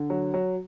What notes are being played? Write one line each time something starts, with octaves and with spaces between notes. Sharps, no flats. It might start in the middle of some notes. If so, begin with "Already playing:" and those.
Already playing: D3
F#3
F#3